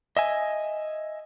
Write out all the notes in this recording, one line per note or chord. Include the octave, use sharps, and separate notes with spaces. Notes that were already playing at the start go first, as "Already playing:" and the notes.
D#5 E5 G#5